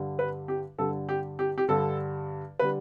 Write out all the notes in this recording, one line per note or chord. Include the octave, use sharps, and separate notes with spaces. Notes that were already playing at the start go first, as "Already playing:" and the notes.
Already playing: G2 D3 G3
B4
G4
G2 D3 G3 A4
G4
G4
G4
G2 D3 G3 A4
D3 G3 B4